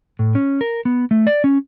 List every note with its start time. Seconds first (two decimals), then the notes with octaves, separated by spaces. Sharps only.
0.19 A2
0.35 C#4
0.61 A#4
0.85 B3
1.11 A3
1.27 D5
1.44 C#4